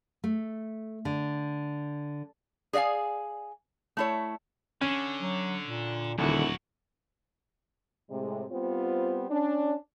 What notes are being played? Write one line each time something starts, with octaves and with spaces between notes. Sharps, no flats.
A3
D3
G#4 D5 D#5 F5 G#5
A3 E4 C#5
D3 C#4
F#3
A#2
D#1 B1 E2 D3 E4 F#4
A2 C3 G#3
G3 B3 C4 F4 C5
C#4 D4